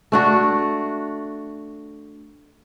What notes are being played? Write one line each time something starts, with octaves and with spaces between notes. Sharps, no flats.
A3 D4 F#4